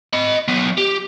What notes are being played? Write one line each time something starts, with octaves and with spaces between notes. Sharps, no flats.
D#5 B5
F#3 B3
G4